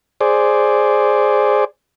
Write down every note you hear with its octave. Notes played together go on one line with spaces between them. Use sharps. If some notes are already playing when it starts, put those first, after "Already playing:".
G#4 C5 D5